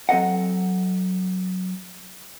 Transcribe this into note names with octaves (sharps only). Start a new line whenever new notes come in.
F#3 C4 A4 D#5 F#5